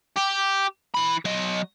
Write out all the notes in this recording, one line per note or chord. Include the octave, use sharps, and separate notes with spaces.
G4
E3 B5
F#3 D#5